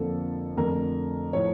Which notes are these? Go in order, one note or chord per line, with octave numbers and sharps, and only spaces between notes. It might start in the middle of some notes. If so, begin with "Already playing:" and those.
Already playing: F2 D3 F3 A#3 A4
F2 D3 A3 A#4
A2 F3 A3 C#5